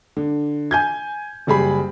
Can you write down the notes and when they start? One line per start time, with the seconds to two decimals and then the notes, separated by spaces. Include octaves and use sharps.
0.17 D3
0.71 G#5 G6 G#6
1.47 F#1 G3 G#4 B5